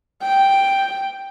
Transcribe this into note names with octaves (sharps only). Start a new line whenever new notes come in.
G5